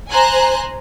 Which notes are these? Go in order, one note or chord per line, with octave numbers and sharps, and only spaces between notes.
C5 G#5 A#5 F#6